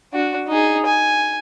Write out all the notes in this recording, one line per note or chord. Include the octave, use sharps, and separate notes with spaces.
D4 F#4
D#4 G#4
G#5